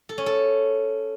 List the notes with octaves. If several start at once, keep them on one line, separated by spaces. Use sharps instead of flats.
A4
C#4
A4